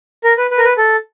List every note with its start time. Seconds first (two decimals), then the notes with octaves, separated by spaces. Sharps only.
0.24 A#4
0.38 B4
0.51 B4
0.58 A#4
0.64 B4
0.78 A4